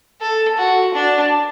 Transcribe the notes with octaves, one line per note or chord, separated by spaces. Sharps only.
A4
F#4
D4